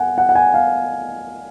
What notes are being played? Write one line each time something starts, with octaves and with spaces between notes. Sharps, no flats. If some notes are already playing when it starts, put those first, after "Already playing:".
Already playing: F#5 G#5
F#5
F#5
G#5
F5